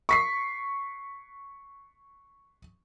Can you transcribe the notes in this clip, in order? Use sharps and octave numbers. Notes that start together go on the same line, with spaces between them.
C#6 B6 C7